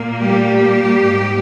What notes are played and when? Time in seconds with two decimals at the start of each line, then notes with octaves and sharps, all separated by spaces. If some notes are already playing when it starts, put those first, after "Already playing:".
Already playing: A#2 A#3
0.20 G3 G4
1.05 G#2 G3 A#3